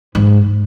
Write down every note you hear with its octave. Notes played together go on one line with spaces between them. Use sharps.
G#2